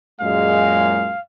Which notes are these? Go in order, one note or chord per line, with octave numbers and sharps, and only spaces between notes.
F#2 A#2 G#3 F5